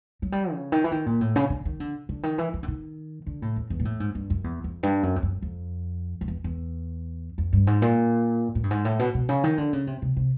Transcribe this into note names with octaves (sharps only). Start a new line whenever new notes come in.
F#3
G3
C#3
D#3
E3
D#3
A#2
A2
C#3
D3
D#3
D3
D3
D#3
E3
E3
D3
D#3
D3
A2
E2
E2
A#2
A2
G#2
G2
F#2
E2
F2
G2
F#2
F2
F#2
F2
F2
E2
E2
F2
G2
G#2
A#2
A2
G2
G#2
A2
B2
B2
C#3
D#3
D3
C#3
C3
C3
C3